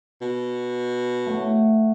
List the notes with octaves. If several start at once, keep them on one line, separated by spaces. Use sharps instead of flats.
B2
A3 F#5